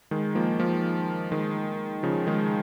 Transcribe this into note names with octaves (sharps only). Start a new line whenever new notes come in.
D#3 G#3
F3 A#3
F3 A#3
D#3 G#3
C#3 F3
D#3 G#3